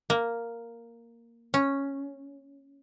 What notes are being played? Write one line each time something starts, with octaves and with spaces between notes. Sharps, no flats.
A#3
C#4